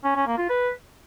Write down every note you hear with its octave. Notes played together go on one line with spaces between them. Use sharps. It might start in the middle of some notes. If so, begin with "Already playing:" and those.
C#4
C#4
A#3
F4
B4